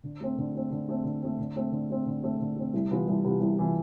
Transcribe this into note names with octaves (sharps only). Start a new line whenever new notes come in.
D3
A3 C4
D3
A3 C4
D3
A3 C4
D3
A3 C4
D3
A3 C4
D3
A3 C4
D3
A3 C4
D3
A3 C4
C2
C3 E3 B3 F4
C2
C3 E3 B3 F4
C2
C3 E3 B3 F4